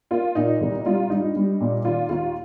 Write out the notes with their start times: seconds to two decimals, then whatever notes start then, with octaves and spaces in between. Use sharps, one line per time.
0.11 A#3 F4
0.35 A#2 D#4
0.61 C2
0.86 G3 F4
1.10 G2 D#4
1.36 G3
1.60 A#2
1.85 D#3 F4
2.09 D#2 F4